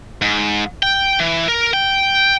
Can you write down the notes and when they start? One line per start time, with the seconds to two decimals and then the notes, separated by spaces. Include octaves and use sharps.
0.22 G#2
0.83 G5
1.20 E3
1.48 A#4
1.73 G5